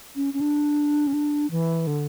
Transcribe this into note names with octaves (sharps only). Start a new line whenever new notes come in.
C#4
C#4
D4
C#4
D4
E3
D3